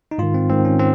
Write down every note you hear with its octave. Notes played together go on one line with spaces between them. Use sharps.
D#4
G#2 D#3 F4
C4
G#2 D#3 C4
C#4
C4